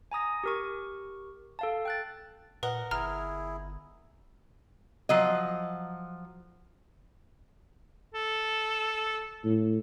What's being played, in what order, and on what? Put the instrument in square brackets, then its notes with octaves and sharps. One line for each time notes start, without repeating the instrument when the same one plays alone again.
[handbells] G#5 A#5 D#6 A#6
G4 A#4 C#6
A4 F5 A5
G5 F#6 A6
[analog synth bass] A#2 [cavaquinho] A#4 D#5 F#5 [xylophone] B4
[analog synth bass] G1 [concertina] E4 G#4 [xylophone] A#5 F6
[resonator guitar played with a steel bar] F3 F#3 D#5
[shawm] A4
[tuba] A2